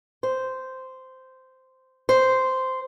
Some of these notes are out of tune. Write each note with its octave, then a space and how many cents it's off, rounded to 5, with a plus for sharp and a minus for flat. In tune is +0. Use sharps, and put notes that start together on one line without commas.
C5 -10
C5 -10